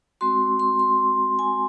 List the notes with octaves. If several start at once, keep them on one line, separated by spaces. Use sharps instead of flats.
G#3 C4 F#4 C6
C6
C6
G#5